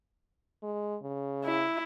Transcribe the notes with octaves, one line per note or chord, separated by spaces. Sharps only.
G#3
C#3
E4